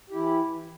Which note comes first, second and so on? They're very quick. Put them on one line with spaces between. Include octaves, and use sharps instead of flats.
G4 E4 E3